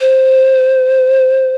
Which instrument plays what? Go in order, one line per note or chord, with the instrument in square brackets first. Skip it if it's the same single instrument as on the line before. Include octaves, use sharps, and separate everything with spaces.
[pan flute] C5